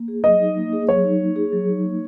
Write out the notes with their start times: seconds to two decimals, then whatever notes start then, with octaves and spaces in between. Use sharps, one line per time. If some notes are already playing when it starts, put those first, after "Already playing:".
Already playing: A#3
0.08 G#4
0.24 F#3 D#5
0.40 D#4
0.57 A#3
0.73 G#4
0.88 F#3 C#5
1.04 D#4
1.20 A#3
1.36 G#4
1.52 F#3
1.69 D#4
1.84 A#3